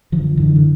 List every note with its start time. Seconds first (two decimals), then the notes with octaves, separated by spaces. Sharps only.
0.12 F#2 D#3 F3
0.17 D3
0.37 D3 E3
0.56 D3